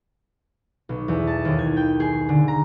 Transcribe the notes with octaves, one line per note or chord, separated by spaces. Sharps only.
B1
E2
A5
D#2
G#6
G5
G#4
D3
A#5